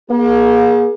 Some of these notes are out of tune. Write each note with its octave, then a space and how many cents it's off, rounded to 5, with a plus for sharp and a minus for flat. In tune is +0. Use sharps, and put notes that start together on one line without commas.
A#3 +40 G#4 +0